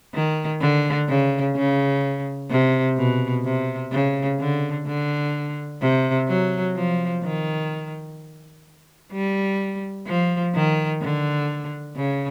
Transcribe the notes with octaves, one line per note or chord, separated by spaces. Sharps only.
D#3
D3
C#3
C#3
C3
B2
C3
C#3
D3
D3
C3
F#3
F3
D#3
G3
F3
D#3
D3
C#3